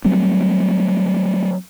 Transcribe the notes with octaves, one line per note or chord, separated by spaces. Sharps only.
F#3 G3 A3 C4